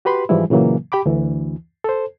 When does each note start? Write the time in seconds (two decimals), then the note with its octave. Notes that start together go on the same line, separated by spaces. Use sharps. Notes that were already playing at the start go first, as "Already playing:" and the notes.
0.05 F#4 G4 B4 B5 C6
0.29 G#2 E3 F3 G3 G#3 E4
0.50 A#2 C#3 E3 F#3 A#3
0.92 G4 G5 B5 D6
1.06 D2 E3
1.84 A4 C5